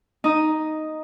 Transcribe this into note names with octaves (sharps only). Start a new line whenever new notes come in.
D#4 D#6